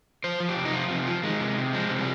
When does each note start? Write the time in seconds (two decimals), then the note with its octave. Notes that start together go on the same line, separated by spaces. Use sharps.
0.24 F3 C5
0.40 F3
0.49 G4
0.56 C3
0.65 D#4
0.73 F3 F4
0.90 C3
1.07 F3
1.23 D#3 G#3
1.41 C3
1.58 C3
1.73 F3 G#3
1.90 C3
1.99 G3